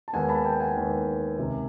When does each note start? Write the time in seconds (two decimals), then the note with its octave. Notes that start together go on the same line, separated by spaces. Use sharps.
0.08 A5
0.13 D#2 D#3 G#3 B3 F#5 G#5
0.29 A5 B5
0.44 G5 A5
0.60 F#5 G#5
0.76 D#2 D#3 G#3 B3
1.38 C#2 C3 D#3